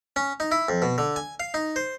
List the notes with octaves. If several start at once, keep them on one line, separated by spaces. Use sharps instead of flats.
C#4
D#4
E4
F2
B2
D3
G#5
F5
D#4
C5